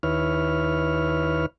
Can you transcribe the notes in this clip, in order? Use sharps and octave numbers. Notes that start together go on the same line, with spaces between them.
D#2 E4 B4 C#5 F6